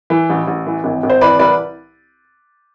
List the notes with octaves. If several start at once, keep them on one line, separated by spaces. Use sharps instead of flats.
E3
A1
A1
E3
G#1
G#1
C5
E3 B4 D5
C2 B4 D5